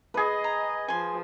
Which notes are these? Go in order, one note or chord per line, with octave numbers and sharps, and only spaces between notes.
G#4 B4 D#5
A#5
F3 G#5 C6